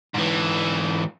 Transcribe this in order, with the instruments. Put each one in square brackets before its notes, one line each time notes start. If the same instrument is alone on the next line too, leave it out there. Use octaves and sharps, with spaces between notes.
[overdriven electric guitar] G#2 E3